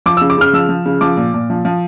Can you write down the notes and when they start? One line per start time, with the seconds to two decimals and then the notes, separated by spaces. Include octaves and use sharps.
0.06 F3 D6
0.17 C#3 E6
0.30 D6
0.38 C#3 F6
0.53 F3 E6
0.69 F3
0.86 C#3
1.01 F3 D6
1.17 A#2
1.34 A#2
1.50 F3
1.65 F3